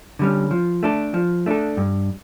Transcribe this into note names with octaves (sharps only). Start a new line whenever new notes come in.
D3 G3 C#4
F3
A3 D4 A4
F3
A3 D4 A4
G2